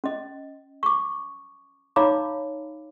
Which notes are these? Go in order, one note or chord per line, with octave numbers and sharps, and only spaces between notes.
C#4 D#5
C#6 D6
D#4 C#5 F5 A#5 B5 D6